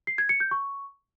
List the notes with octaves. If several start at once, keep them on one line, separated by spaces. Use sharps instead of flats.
C7
G#6
C#7
G6
C#6